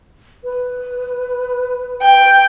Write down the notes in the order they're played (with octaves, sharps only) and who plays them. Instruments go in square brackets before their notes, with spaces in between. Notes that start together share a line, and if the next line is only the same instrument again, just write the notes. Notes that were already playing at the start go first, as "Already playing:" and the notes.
[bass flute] B4
[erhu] G5